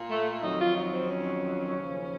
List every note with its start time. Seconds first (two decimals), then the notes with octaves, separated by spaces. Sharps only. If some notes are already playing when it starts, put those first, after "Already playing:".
Already playing: A#2
0.09 A3
0.42 F2 D#3 F#3 D#4
0.60 F4
0.76 D#4
0.92 C4
1.10 C#4
1.77 D#2 C#3 F3